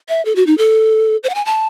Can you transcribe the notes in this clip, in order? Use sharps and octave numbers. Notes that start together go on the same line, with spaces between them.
E5
A4
F#4
D#4
A4
C5
F#5
G#5
A5